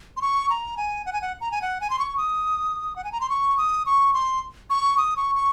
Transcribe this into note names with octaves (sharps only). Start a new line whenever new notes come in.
C6
C#6
A#5
G#5
F#5
G#5
F#5
A#5
G#5
F#5
G#5
C6
C#6
D#6
F#5
G#5
A#5
C6
C#6
D#6
C#6
C6
C#6
D#6
C#6
C#6